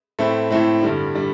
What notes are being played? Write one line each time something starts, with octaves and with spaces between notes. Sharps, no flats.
A2 A3 C4 E4
A2 A3 C4 E4
G2 D3 G3 D4
D3 G3 D4